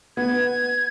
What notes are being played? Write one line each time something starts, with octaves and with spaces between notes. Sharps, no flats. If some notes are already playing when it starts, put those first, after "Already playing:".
B3 G#6